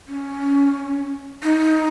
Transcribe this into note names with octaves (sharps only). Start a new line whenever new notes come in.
C#4
D#4